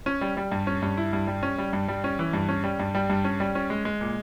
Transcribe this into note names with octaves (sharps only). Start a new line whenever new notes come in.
C#4
G3
G3
G2
C#4
G2
E4
G2
G3
C#4
G3
G2
G3
C#4
E3
G2
C#4
G3
G2
G3
G2
C#4
G3
C#4
G#3
G#3
A#2